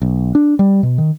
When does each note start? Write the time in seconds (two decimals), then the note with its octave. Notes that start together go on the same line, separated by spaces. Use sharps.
0.02 B1
0.35 D4
0.59 G3
0.83 B2
0.98 D#3